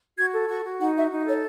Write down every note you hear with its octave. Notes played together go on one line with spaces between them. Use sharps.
F#4 G#6
A4
F#4 C#6
F#4
D#4 F#5
F#4 E5
D#4
A4 C#5